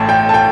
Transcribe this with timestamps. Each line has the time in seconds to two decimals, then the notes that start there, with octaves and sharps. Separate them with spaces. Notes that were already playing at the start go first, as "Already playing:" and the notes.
Already playing: A1 A2 A5
0.09 G5
0.29 A5
0.34 G5